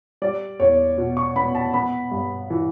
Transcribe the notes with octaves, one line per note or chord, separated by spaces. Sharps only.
G3 D5
E2 C#5
B2
C#6
B3 B5
A5
B3 B5
G2
E3